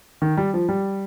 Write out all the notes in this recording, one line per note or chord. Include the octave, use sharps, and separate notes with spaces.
D#3
G3
F3
G3